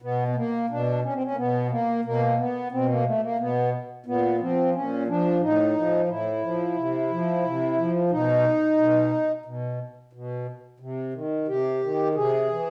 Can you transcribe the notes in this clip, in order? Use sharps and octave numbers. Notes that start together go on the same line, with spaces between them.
B2 B3
B3
A#3
B2 D4
C#4
C4
C#4
A#3
B2 B3
A#3
B2 A#3
B3
B2 C4
A#3
A3
A#3
B2 B3
A#2 B3
F3 C4
A#2 C#4
F3 D4
A2 D#4
F3
A2 E4
F3
C3
F3
C3
F3
B2 D#4
B2
B2
B2
C3
D#3
C3 G4
D#3
C3 G#4
E3